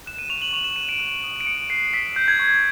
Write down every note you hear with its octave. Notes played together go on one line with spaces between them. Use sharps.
F#6 E7
D#7
C#6 F7
F#7
C#6 F7
E7
F#6 D#7
D7
F#6
D#6
D7
D#6 C#7
F#6 C7
E6 B6
G6
G#6
C#6